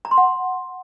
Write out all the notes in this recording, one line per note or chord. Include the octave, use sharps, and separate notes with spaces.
A#5
C6
F#5